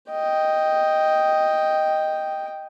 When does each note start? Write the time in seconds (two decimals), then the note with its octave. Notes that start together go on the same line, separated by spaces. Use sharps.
0.11 D#5 G5